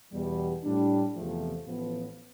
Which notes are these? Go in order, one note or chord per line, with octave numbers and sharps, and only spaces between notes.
E2 B2 G3
A2 G3 D4
E2 C3 F3 A3
A1 A2 F3 B3